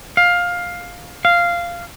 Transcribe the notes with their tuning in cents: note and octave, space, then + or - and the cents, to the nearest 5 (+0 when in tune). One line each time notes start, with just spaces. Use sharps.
F5 +15
F5 -10